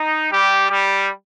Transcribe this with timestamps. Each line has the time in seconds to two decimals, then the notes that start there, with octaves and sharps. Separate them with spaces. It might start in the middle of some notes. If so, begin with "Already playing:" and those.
Already playing: D#4
0.32 G3 G4
0.70 G3 G4